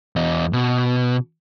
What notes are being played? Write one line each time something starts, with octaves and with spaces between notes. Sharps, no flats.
E2 D#5
B2